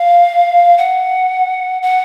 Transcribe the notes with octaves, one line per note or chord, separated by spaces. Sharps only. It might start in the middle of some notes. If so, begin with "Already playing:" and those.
Already playing: F5
F#5
F#5